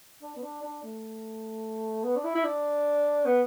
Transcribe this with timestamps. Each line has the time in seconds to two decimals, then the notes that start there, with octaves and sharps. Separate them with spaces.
0.22 D4
0.36 B3
0.43 D4
0.62 D4
0.83 A3
2.04 B3
2.16 D4
2.24 E4
2.35 E4
2.44 D4
3.25 B3